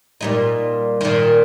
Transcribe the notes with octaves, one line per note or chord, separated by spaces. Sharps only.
A#2 G3 D#4
A#2 D#3